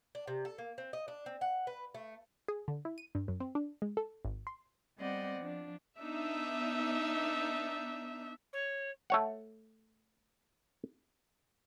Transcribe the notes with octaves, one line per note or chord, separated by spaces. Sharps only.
D4
C3
A4
A#3
C4
D#5
D4
C4
F#5
B4
A3
G#4
D3
E4
D#7
G2
F#2
C4
D4
G#3
A4
G#1
C6
G3 B3 C4 D5 D#5 F#5
F3 D4
B3 D4 D#4 E5
C#5
A3 C#5 F#5